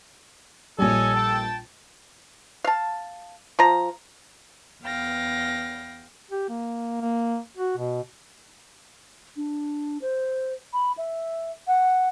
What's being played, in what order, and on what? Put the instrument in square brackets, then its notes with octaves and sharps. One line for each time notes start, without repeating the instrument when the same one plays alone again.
[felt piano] A#1 G3 [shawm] A4 [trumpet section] C#5 D#5 G#5
[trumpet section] G5 A5
[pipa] F5 A5
F3 A#5
[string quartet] E2 B3 F5 G5 A#6
[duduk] G4
A#3
A#3
F#4
B2
[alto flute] D4
C5
B5
E5
F#5